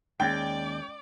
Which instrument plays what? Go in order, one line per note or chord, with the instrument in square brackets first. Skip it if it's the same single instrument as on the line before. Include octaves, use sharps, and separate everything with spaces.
[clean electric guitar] D#2 [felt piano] G#3 C#4 [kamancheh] D5 D6 [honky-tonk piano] G5